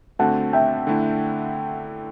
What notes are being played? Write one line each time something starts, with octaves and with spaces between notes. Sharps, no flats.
D3 A3 C4 F#4 F#5 A5
E5 G5
D3 A3 E4